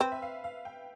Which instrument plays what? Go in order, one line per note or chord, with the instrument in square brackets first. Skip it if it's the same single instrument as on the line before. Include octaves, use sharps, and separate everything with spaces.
[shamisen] C4 [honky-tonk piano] B4
[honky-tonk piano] E5
F5
F5
G5